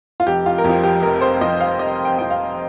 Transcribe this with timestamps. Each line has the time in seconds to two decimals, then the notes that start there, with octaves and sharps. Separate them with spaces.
0.20 F4
0.27 F1 G4
0.46 F4
0.58 A#4
0.64 F2 G4
0.69 F3
0.83 G4
1.02 F1 A#4
1.21 C5
1.41 F2 F3 D#5
1.60 F5
1.79 F1 D#5
2.05 G5
2.18 F2 F3 G5
2.30 F5